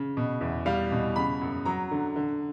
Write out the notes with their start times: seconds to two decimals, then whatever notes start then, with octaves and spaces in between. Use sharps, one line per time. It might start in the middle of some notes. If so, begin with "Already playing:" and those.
Already playing: C#3
0.17 B2
0.41 E2
0.66 G3 F5
0.92 B2
1.16 C#3 B5
1.41 F#2
1.65 F#3 A#5
1.91 D3
2.16 D3